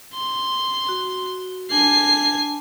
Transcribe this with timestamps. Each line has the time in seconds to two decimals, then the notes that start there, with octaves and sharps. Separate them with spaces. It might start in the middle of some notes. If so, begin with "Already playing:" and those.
0.15 C6
0.89 F#4
1.71 D4 G#5 A5 C7